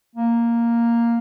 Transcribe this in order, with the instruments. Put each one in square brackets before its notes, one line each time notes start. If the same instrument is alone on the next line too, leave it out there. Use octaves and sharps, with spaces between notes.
[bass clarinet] A#3